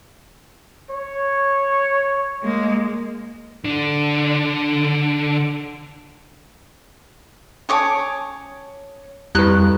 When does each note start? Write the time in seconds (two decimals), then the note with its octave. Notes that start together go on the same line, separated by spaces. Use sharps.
0.90 C#5
2.43 G#3 A#3
3.65 D3 D4
7.69 C#4 C#5 G#5 A5 D6 D#6
9.35 F2 G3 E4 B4 C#6 F#6